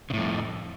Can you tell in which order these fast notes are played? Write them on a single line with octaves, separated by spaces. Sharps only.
C#3 A2 F2